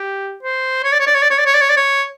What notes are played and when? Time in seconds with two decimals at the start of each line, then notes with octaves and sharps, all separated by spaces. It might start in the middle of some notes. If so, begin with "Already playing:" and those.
Already playing: G4
0.43 C5
0.84 C#5
0.92 D5
1.00 C#5
1.07 D5
1.15 C#5
1.22 D5
1.30 C#5
1.38 D5
1.46 C#5
1.54 D5
1.61 C#5
1.70 D5
1.77 C#5